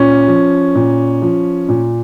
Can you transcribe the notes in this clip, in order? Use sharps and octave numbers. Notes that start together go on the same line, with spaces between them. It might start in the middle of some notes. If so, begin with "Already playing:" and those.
Already playing: A#2 C#4
F3
A#2
F3
A#2